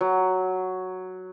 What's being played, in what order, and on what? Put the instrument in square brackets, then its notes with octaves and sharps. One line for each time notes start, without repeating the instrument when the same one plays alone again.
[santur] F#3